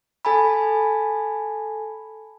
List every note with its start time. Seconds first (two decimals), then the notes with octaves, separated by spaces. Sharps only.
0.25 A4 G#5 A5 B5